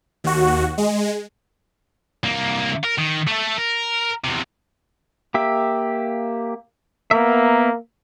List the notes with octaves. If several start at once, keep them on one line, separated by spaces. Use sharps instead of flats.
D#2 F#4
G#3
C2 A#3
A#4
D#3
A3 A4
A#4
E2 C3
A#3 G4 E5
A#3 B3 A#4 E5